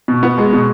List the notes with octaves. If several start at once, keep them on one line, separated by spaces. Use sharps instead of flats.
B2
B3
G#3
B2